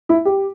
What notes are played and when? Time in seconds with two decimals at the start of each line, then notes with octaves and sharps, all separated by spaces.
0.09 E4
0.25 G4